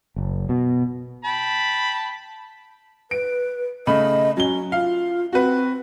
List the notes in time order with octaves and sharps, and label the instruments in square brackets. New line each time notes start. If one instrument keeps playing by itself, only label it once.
[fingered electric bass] F#1
B2
[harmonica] G5 A5 B5
[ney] B4 [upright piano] D7
[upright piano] C#3 A3 B5 [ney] D#5
[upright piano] F#3 G7 [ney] C#4
[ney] F4 [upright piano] F5
[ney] C4 [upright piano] F#4 B4